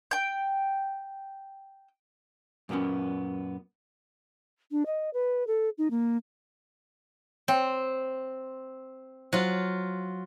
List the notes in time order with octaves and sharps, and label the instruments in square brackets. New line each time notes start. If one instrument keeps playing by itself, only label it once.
[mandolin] G5 G6
[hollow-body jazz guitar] F#2 A#2 A#3 B3 C#4
[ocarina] D4
D#5
B4
A4
D#4
A#3
[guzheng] C4 [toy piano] C#5 G5
[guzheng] F#3 F4 [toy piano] C5